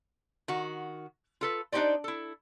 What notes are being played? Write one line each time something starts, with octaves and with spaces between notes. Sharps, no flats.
D#3 F#4
F4 A4 B4
D4 D#4 F#4 G4 C5 D5
E4 A4